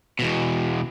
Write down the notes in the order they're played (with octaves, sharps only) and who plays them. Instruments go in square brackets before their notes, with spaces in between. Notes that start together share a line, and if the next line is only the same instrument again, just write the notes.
[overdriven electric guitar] E2 B2